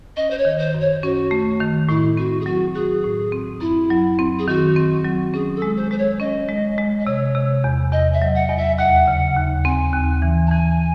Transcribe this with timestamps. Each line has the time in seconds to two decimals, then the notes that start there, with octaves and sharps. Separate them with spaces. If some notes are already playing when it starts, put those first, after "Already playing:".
0.17 C#4 D#5
0.30 C5
0.38 C#5
0.45 D#3
0.59 C5
0.74 F#2
0.81 C#5
1.02 C#4 F#4
1.31 A3
1.60 D#3
1.89 A2 E4
2.17 C4 F#4
2.41 G#4
2.46 F#3 F#4
2.74 F#4 G#4
3.04 A2
3.32 C4
3.61 F#2 E4
3.90 F#3
4.19 C4
4.39 G#4
4.48 D#3 F#4
4.76 C4
5.05 F#3
5.34 C#4 G#4
5.56 A4
5.62 G#3
5.77 C5
5.91 G#3 C5
5.98 C#5
6.20 C#4 D#5
6.49 G#3
6.78 G#3
7.00 D#5
7.06 C3 C#5
7.35 C3
7.64 E2
7.92 E2 D#5
8.13 E5
8.22 F#3
8.35 F#5
8.47 E2 D#5
8.57 E5
8.78 D#2 F#5
9.08 C#3
9.36 D#2
9.64 C4 G#5
9.93 D#2
10.22 E3
10.47 A5
10.51 E3 G#5